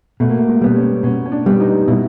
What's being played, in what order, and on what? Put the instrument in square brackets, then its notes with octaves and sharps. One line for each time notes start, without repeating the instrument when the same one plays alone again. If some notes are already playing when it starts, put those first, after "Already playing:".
[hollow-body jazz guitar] B2 [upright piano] A3
[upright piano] A#3
A3
G#3
[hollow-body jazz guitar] G3 B3
[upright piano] C#4
[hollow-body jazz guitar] B2 [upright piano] C#4
[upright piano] C#4
D4
[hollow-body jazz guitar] G3 B3
[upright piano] D#4
[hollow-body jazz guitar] B2 [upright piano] E4